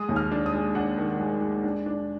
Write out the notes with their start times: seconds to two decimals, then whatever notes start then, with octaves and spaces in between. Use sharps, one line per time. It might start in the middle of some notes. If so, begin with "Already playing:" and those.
Already playing: G#3 D#6
0.09 D#2
0.16 F6
0.31 D4
0.46 D#6
0.54 G#3
0.75 D4 F#5
0.97 D#3
1.19 G#3
1.41 G#3
1.64 D4
1.86 D4